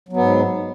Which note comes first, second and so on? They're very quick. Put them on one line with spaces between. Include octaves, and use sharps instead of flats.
F#3 B3 G#2